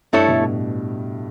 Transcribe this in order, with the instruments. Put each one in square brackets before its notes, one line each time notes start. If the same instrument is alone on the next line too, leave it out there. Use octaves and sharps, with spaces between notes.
[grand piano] G2 [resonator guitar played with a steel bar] A3 E4 A4 C#5
[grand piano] B2
A2